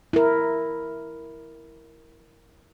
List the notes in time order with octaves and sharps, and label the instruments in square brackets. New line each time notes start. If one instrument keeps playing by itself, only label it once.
[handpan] E4 A#4